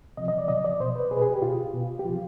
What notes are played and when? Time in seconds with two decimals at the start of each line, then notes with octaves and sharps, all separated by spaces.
0.17 C3 F3 D#5
0.28 D#5
0.38 D5
0.48 C3 F3 D#5
0.64 D5
0.80 B2 C5
0.96 B4
1.11 B2 G#4
1.17 B4
1.22 G#4
1.32 G4
1.42 B2 F4
1.74 B2
1.99 G4
2.05 C3 F3 F4